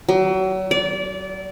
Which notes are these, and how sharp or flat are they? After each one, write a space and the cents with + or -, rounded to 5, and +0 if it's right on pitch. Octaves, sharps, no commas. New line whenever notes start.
F#3 +35
D5 -25